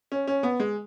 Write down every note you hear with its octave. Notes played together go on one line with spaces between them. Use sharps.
C#4
C#4
B3
G#3